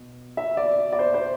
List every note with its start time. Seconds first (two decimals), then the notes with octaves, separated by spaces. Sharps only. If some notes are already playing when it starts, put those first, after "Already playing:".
Already playing: B2
0.37 E5
0.57 D5
0.92 D5
0.99 C5
1.14 C5